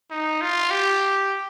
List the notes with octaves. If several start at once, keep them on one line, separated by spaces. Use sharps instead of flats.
D#4
F4
G4